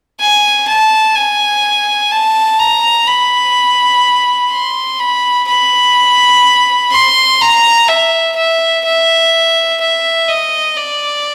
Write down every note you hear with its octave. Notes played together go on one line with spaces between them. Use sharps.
G#5
A5
G#5
A5
A#5
B5
C6
B5
B5
C6
A#5
E5
E5
E5
E5
D#5
D5